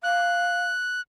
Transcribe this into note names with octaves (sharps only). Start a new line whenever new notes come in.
F5 F#6